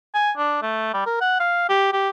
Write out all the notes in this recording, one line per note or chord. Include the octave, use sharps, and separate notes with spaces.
G#5
D4
A3
G3
A#4
F#5
F5
G4
G4